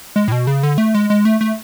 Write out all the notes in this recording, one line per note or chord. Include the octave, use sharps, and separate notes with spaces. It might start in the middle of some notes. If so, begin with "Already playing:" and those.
G#3
A2
B2
C#3
D3
A3
G#3
G#3
A3
A3